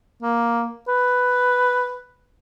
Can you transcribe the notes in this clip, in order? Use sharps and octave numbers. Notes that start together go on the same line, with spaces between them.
A#3
B4